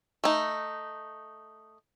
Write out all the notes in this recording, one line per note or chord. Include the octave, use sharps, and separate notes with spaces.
A3 D#4